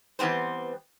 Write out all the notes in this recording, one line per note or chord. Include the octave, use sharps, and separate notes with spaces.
E3 G3 B3 C4 C5